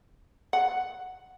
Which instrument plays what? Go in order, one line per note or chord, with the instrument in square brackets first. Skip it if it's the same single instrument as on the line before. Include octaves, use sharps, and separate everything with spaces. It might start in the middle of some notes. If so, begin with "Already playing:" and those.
[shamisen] F#5